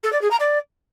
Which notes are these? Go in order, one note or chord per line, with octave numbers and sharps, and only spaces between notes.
A4
D5
G#4
A#5
D5